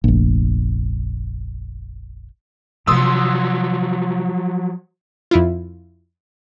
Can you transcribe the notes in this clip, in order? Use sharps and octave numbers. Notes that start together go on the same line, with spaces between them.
F1 A#1
C3 D#3 F3 F#3 C6 D#6 E6
F2 E4 F4